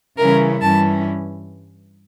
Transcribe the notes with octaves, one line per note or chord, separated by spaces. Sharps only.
C#3 E3 G3 C#4 E4 A#4
G2 E3 G3 C#4 E4 A5